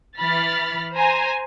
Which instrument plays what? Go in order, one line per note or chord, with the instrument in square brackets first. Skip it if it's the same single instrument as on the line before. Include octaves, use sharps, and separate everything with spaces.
[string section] E3 B5 F6 A6
C5 G#5 A#5